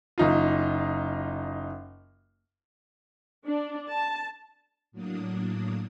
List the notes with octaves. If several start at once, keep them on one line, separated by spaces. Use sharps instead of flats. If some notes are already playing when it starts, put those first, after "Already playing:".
F#1 D#4 F4
D4
A5
A2 F#3 A#3 D4 D#6